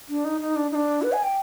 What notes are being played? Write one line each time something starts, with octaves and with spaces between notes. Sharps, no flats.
D4
D#4
D#4
D4
D#4
D4
B4
G#5
G5